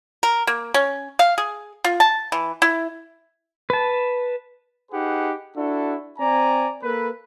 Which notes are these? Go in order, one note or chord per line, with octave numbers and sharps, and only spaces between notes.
A#4
A#3
C#4
F5
G#4
F4
A5
E3
E4
B4 A5
D#4 G4 G#4 B4 F#5
D4 E4 F#4 A4
C4 D5 G#5 A#5
A#3 A4 B4